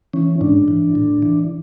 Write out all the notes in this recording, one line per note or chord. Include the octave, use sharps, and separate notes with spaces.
E3 C#4
G#2 D4
E3
A2
E3